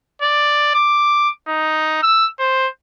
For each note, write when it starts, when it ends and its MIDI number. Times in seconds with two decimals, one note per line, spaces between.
0.22 0.70 74
0.74 1.30 86
1.48 2.00 63
2.03 2.27 88
2.39 2.67 72